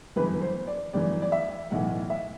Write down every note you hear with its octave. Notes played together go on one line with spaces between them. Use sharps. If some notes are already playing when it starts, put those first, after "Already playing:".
G1 F#2 E3 B4
C5
D5
G1 F#2 E3 D5
D5
E5
B1 A2 E3 F#5
E5